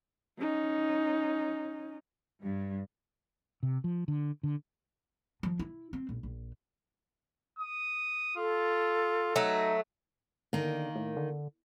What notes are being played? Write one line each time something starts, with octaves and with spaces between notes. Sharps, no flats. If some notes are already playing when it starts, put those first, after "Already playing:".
C#4 D#4
G2
C3
F3
D3
D3
F3
E4
C4
A#1
A#1
D#6
F4 A4
F#3 A3 D#4
D3 D#3 A#3
A2
D3